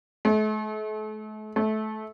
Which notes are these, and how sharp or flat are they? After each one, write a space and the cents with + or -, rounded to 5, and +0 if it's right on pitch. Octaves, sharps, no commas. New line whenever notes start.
A3 -40
A3 -20